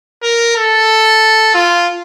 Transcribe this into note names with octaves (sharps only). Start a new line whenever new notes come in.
A#4
A4
F4